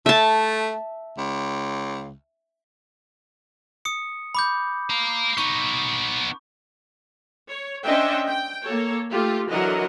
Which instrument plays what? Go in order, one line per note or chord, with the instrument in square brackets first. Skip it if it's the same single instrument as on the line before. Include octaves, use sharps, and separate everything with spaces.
[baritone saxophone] A3 [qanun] E5 A5
[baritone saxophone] C#2
[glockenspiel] D#6 C#7
B5 D6 G6
[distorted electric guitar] F5 A#5
[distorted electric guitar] B3 D#4 [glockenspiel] C#6
[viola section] C#5
C#4 D4 C5 D#5 E5 G5
G5
A#3 A4 C#5
A3 F4 G4
D3 E3 F#3 A#4 D#5 F#5